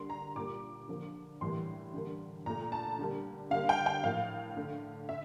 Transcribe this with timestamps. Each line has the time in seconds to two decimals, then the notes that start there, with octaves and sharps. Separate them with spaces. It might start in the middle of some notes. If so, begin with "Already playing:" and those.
Already playing: D3 G3 A#3 C6
0.10 A#5
0.35 A#2 G3 A#3 D6
0.88 D3 F3 A#3
1.41 A2 E3 G3 A#3 C6
1.94 D3 G3 A#3
2.46 A#2 A3 A#5
2.72 A5
2.99 D3 G3 A#3
3.51 D3 G3 A#3 F5
3.69 G5
3.86 G5
4.03 A2 F3 A#3 F5
4.57 D3 A3
5.09 D3 E5